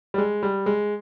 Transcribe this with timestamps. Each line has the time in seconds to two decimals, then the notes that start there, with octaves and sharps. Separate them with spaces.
0.14 G3
0.18 G#3
0.43 G3
0.66 G#3